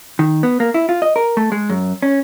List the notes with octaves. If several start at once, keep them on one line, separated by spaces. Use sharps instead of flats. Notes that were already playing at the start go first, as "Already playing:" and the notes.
D#3
B3
A#3
E4
F4
D#5
A#4
A3
G#3
F#2
C#4